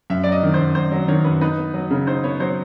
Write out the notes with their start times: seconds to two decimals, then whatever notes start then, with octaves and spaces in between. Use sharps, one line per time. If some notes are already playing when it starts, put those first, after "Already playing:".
0.10 F#2 E5
0.24 D5
0.26 F#3
0.32 D#5
0.43 D#3
0.54 C5
0.59 F#2
0.75 F#2 C5
0.92 F#3
1.08 D#3 C#5
1.24 F#2 B4
1.41 D#4 B4
1.58 B3
1.74 F#3
1.91 C#3
2.07 D#4 C5
2.24 B3 C#5
2.40 F#3 C5